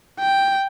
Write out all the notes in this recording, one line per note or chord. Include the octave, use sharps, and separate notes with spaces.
G5